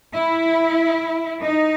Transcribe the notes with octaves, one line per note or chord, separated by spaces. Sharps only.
E4
D#4